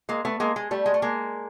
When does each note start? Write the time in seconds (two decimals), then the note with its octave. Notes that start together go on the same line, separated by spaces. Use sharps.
0.09 G#3 A#3
0.25 A3 B3
0.40 G#3 A#3
0.56 G#3
0.71 G3 A3
0.86 G#3
0.94 A3
1.02 G#3 A#3